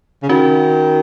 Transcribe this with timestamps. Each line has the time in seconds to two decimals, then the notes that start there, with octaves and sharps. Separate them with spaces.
0.23 C#3
0.29 D#3 C#4 F#4